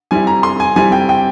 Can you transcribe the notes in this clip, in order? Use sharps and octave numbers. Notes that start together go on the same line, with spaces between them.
G3 C4 E4 G#5
A#5
C6
G#5
G3 C4 E4 G#5
G5
G5